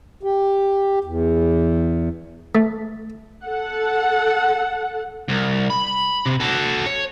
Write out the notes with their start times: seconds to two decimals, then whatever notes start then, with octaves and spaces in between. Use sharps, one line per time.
0.23 G4
1.04 E2
2.55 A3
3.45 A4 F#5
5.29 C2
5.70 B5
6.26 C3
6.40 F#4 A4
6.86 C#5